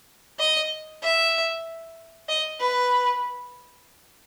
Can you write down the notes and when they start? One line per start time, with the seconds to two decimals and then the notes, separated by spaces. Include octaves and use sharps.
0.40 D#5
1.03 E5
2.29 D#5
2.60 B4